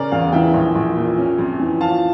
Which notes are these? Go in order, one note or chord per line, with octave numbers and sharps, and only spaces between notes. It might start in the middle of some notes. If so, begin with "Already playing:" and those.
Already playing: C#3 C#4 A#4 D5
E2 D5 F5
E3 E5 G5
A#1
A#1
A#2
C#4
F2
E3
F3 F5 A5